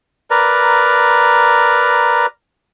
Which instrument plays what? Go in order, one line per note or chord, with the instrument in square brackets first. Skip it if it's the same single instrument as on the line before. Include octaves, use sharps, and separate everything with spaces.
[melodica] A#4 B4 D5 A#5